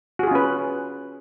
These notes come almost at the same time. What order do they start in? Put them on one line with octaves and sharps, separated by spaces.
F#4 G#4 F4 C#4 B4